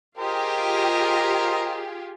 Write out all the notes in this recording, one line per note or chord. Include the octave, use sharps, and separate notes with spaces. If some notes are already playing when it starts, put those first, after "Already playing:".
F4 G4 G#4 A#4 C5 D#5